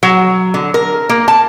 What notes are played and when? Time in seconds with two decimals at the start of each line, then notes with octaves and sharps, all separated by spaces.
0.03 F#3
0.54 D3
0.74 A#4
1.09 A#3
1.28 A5